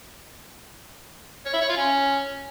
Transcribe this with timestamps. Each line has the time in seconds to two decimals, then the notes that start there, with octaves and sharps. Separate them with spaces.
1.46 C#5
1.54 E4
1.61 C#5
1.69 F4
1.77 C#4